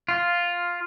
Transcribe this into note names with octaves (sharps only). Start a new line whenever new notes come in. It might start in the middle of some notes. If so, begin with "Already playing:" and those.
F4